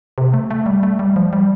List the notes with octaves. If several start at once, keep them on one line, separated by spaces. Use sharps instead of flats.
C3
A3
A3
G3
A3
G3
F3
G3